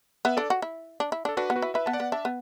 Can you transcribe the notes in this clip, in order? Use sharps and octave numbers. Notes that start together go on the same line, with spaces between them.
B3 B4 E5
D4 A4 D5
F#4
E4
D4
E4
D4
A4
D4 F#4 B4
B3
F#4 B4
E4
E4 B4 E5
B3 A5
D5 F#5
B3
D4 E5 A5
B3